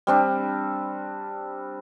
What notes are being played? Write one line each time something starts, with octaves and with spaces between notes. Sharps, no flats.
G3 C4 D4